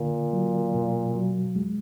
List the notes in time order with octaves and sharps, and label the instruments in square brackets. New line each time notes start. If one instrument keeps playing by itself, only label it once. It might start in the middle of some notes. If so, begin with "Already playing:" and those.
Already playing: [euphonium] A#2 [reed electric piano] D3
[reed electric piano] F#3
B2
F#3
G#3